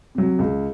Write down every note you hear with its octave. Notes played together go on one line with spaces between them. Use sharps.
C3 F#3
C#2